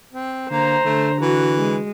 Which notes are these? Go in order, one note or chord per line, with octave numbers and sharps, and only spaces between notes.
C4
D3 A#3 C5 A#5
D3 A3
E3 F#4
G#3